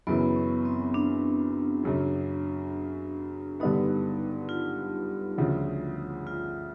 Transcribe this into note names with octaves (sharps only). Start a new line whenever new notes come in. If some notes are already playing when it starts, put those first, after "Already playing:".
F#2 C#3 E3 B3
C#4
C4
D4
F#2 C#3 F#3
G2 D3 G3 B3 D#4
F4
D2 C#3 F3
F4